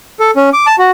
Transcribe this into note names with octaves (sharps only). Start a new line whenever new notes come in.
A4
C#4
D6
A5
F#4